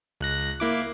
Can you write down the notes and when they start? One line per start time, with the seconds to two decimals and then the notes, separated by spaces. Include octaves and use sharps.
0.21 C#2 F#6 A#6
0.60 A#3 E4 D6